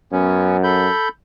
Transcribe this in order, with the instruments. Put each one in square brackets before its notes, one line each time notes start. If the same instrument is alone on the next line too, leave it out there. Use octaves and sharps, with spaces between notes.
[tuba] F#2 [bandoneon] B3 C#4
[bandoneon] A4 B5 G6